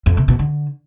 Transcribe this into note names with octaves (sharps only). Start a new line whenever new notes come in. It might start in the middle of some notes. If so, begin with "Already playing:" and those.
F2
C3
B2
D3